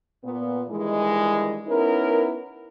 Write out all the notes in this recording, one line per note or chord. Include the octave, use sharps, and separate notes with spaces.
A#2 B3
G2 D#3 E3 G#3
B3 C#4 D#4 E4 A#4